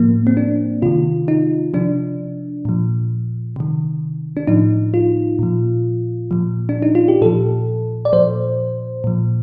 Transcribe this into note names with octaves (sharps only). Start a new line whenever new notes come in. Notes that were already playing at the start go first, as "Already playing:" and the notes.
Already playing: A2 F3 A#3
C4
D4
C3 D#3 F4
D#4
C3 F3 D4
A#2 F3
C3 D#3
D4
A2 F3 D#4
F4
A#2 F3
A#2 F3
D4
D#4
F4
G4
A#2 F3 A4
D5
A#2 F3 C5
A#2 F3